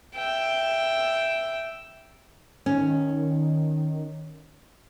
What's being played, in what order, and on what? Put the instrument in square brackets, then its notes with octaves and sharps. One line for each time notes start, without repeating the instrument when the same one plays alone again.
[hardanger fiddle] E5 G5
[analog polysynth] D#3 [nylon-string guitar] C#4